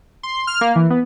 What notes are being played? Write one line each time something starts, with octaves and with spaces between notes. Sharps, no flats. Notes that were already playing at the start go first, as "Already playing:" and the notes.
C6
F6
A#3
E3
B3